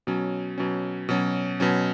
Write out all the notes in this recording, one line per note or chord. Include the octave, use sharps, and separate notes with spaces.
B2 F#3 C#4
B2 F#3 C#4
B2 F#3 C#4
B2 F#3 C#4